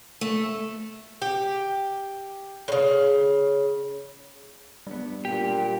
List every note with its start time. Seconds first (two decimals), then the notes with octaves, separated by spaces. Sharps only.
0.21 A3
1.22 G4
2.68 A2 C#3
4.87 G2 G3 B3
5.25 A#2 G4